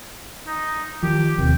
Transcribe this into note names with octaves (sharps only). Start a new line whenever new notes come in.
D#4
D#3 F3 G4
E1 D#2 C3 G5